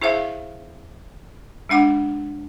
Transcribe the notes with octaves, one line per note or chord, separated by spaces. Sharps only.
E4 G#4 C5 E5 F5
G#3 D4 F#5 D6